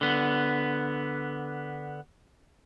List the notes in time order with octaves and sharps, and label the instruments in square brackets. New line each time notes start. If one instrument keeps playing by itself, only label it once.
[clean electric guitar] D3 B3